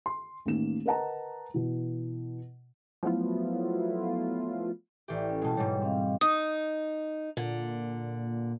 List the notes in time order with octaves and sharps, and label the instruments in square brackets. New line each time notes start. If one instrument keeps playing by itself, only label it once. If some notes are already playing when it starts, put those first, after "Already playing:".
[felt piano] C6
A1 D#3 A#3 E7
A#4 B4 D#5 F#5 A5 A#5
B2 E3
[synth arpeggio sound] F3 F#3 A3 B3 E4 F4
[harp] A1 G4 [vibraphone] D5 E5
[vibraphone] C#4 A4
[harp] B2 G#3 [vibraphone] G5 A5
[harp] G#2 B2 G3 [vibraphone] C#5
[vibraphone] C4 D#5 F5
[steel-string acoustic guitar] D#4 [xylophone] D#6
[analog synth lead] A#2 [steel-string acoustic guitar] D3